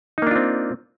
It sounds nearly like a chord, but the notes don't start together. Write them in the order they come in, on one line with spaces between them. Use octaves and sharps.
D#4 A#3 D4 F4 C4